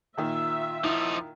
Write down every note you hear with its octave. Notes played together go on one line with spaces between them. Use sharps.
A#2 D#3 F4 E5
F3 D#4 E4